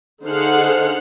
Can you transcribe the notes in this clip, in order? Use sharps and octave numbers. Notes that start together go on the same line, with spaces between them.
D3 D#4 G#4 C5 F5 F#5